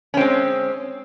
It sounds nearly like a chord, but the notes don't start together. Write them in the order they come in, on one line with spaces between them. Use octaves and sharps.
C#4 C4 G#3